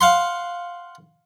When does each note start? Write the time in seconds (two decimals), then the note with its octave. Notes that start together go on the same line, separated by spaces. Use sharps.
0.01 F5 F#5 C6